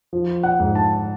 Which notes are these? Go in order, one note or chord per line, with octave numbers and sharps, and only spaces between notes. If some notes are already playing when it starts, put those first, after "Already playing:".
F3
F#5
G#2
A5